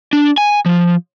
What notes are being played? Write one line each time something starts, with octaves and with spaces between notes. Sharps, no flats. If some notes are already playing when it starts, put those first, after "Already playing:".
D4
G#5
F3